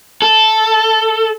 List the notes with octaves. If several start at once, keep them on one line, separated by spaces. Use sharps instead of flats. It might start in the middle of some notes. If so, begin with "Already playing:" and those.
A4